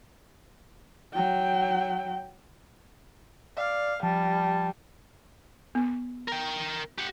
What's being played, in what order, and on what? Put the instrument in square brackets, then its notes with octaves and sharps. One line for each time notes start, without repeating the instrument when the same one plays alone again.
[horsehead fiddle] F#3 G5
[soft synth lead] D5 [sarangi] F5
[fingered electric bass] F3 [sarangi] G3 [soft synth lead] A5
[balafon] B3
[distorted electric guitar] A#4 G5
G4 F#5